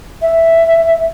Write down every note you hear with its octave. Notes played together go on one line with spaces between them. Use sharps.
E5